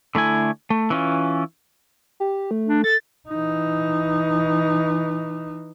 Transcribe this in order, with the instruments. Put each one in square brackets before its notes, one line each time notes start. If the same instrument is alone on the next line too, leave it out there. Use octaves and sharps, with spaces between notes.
[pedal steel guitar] D3 A3 E4 G#5
A3
E3 C#4 F4
[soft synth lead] G4
A3
[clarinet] D4
[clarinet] A4 [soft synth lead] A6
[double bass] E3 D#4